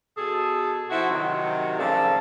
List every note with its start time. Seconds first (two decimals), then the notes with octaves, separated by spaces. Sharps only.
0.17 B2 G#4 A4
0.90 F3 C4 E4 F#4
1.10 C3 D#3 F#3
1.78 A2 C#3 F3 A#3 A4 D5